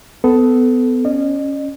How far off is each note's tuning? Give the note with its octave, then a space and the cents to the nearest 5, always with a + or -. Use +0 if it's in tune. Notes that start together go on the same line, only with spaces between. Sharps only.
B3 +25 A4 +0
C#4 +0 D#5 -40